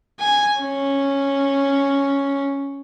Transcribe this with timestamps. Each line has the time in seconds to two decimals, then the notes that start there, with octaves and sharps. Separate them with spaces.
0.20 G#5
0.60 C#4